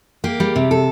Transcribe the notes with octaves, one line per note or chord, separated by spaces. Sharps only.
A#3 G4
G3
C3
A4